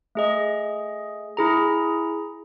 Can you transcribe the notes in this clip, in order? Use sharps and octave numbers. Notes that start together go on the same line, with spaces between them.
A3 G#4 D#5
E4 G#4 A#5